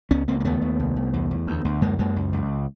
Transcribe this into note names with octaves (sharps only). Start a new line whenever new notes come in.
C#2 B3 C#4
C#2 A#3 C4
A#3
D#2 A3 B3
D#2
C2
C2
E2
E2
D2
D2
F#2 G#3 A#3
F#2 G#3 A#3
C#2
C#2